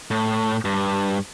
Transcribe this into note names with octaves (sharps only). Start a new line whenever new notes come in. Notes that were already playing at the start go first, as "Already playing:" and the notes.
A2
G2